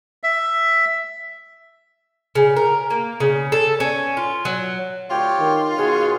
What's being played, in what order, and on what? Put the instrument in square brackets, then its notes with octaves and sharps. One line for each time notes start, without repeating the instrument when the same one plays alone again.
[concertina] E5
[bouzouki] C#3
A#4
A#3
C#3
A4
C#4
F4
F#3
[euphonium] D2 [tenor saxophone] F4 [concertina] G4 C#5 G5
[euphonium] D#3
[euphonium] B2 [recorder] G#4 [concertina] C#5 F#5